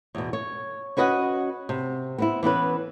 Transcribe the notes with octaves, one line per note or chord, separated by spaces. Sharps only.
E2 B2
C#5
C#4 F#4 B4 D#5 F5 F#5
C3
B3 C4 E4
E3 B3 C#4 B4